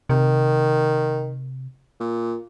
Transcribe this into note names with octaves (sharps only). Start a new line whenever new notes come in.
C3 D#3
A#2